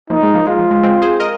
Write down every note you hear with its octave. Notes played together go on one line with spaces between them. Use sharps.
F3 A#3 D#4
G#3
F3 A#3
G#3 F4
F3
G#3
G#3 C4
G#4 C5
A#4 D#5